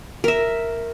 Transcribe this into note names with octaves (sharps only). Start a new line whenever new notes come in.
A#4 E5